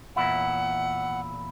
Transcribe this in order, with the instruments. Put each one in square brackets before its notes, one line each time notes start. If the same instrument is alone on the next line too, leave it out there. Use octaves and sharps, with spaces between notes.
[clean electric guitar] E2 A#2 E4 [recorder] F#5